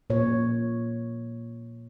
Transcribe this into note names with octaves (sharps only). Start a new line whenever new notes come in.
A#2 C#5